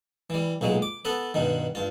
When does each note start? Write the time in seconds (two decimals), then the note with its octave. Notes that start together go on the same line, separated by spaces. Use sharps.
0.30 E3 G3
0.61 B1 A#2 F#3 G#3
0.82 D6
1.05 B3 A4 B4
1.34 G2 B2 D#3
1.75 G2 F4